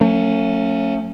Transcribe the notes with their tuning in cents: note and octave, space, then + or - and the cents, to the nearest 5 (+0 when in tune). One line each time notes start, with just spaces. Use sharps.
F#3 -30 A3 +35 C#4 +0